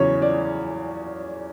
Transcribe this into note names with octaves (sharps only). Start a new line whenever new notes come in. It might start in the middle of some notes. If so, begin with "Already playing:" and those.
Already playing: E2 C#3 F#3 C#5
D5